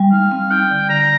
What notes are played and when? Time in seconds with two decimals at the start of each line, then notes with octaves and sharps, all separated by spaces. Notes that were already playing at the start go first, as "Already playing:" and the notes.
Already playing: G3
0.12 D#4 F5
0.32 C4
0.51 D#4 G5
0.71 D3
0.89 D3 A#5